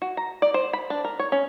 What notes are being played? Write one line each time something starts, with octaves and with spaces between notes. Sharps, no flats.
F#4
A#5
D5
C5
B5
D4
A#4
C#5
C#4